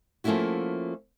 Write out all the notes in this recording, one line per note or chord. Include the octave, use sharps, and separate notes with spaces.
F3 A3 A#3 C#4 E4 F#4